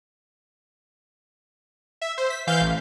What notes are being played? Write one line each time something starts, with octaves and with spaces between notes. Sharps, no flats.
E5
C5
B6
E3 F5 G6
A1